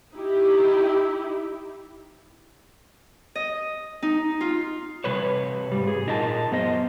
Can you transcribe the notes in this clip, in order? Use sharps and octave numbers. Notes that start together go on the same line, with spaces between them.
D#4 E4 G4
D#5
D#4
F4
C3 G3 B4 C#5
G#2 G3
G#4
A#2 D#4 A#4 D#5 A5
F#2 B3 C5 D#5